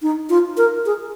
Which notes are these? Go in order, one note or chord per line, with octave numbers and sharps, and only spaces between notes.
D#4
F4
A#4
G#4